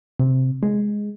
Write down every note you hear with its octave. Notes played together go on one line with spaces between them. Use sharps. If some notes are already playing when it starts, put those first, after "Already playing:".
C3
G#3